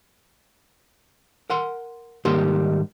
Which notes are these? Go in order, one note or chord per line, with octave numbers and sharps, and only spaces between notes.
A#4 F#5 C6
G#2 D#3 G3 A#3 G4 C6